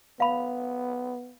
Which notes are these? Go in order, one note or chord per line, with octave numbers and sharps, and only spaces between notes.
B3 F5 B5